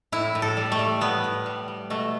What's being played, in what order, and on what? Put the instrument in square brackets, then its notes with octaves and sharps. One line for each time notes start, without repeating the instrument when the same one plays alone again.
[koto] A2 E4
A2
A4
G3
A3
G3
A2 B3
A2
G3
G3
B2 A3